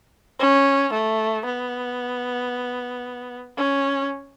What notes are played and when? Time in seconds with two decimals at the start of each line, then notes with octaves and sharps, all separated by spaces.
0.39 C#4
0.93 A3
1.45 B3
3.57 C#4